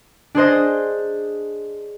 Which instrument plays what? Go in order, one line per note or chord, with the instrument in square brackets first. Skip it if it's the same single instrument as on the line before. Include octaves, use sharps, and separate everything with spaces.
[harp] D4 G#4 C5 D#5